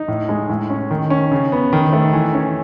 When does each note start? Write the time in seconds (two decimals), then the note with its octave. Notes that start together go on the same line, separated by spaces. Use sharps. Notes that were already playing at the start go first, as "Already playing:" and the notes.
Already playing: D#4
0.08 A2
0.29 G#3
0.49 A2
0.70 C#4
0.91 D#3
1.10 C#4
1.32 C#3
1.52 B3
1.73 D#3
1.92 A3
2.13 E3
2.34 C#4